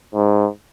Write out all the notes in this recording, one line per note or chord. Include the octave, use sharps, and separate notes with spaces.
G#2